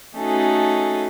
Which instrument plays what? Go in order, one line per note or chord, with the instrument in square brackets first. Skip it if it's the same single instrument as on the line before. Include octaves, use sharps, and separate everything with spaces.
[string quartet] A3 C#4 D#4 F#4 G#4 A4